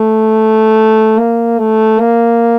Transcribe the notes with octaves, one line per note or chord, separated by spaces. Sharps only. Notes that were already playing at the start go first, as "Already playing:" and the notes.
Already playing: A3
A#3
A3
A#3